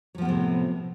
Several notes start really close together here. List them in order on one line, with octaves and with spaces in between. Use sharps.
F#3 F3 B3 A2 C3